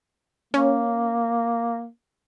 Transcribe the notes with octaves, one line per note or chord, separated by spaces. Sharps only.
A#3 C#4